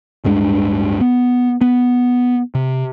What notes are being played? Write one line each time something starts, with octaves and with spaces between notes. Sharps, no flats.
D1 G2 G#3 D4
B3
B3
C3